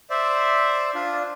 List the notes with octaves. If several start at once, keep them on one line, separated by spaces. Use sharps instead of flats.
C5 D5 E5
D4 F4